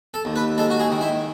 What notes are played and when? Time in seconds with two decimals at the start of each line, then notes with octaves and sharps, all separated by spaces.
0.14 A4
0.25 D#2
0.36 B4
0.58 G#3 A4
0.70 F#4
0.80 G#4
0.90 D#3
1.01 E4